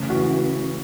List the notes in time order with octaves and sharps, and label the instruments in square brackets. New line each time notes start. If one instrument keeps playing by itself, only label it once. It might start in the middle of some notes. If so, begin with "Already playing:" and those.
Already playing: [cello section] C#3 E3 A3
[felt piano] F#4